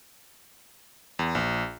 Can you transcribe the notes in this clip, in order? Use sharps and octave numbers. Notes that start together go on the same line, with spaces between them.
E2
A#1